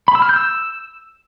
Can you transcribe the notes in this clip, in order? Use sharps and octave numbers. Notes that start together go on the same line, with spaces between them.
B5
E6
F6
G6
E6